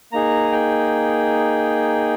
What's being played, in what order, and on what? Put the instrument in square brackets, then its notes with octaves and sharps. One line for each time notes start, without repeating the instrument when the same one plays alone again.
[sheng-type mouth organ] A#3 D#4 G#4 A#5
G5